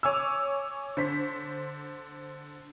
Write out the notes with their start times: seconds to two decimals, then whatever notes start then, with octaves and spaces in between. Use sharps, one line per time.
0.03 C#5 G#5 D6 E6
0.97 D3 C5 B6